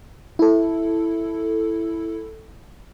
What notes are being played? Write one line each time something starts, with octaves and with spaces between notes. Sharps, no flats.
E4 A4